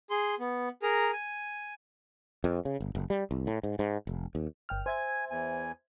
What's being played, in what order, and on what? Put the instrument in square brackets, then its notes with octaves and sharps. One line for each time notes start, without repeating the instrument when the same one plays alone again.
[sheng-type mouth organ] G#4 C6
B3
G#4 A#4 A#5
G#5
[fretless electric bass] F2
C#3
G1
F#1
G3
C2
A2
G#2
G#2
F1
D#2
[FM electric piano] G1 G5 F6
[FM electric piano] C5 E5 G#6 [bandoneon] G#5
[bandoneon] E2 G#5